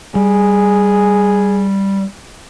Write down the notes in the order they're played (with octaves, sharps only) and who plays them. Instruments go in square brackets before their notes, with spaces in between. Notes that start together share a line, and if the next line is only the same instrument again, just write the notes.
[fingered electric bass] G3 [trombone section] G#4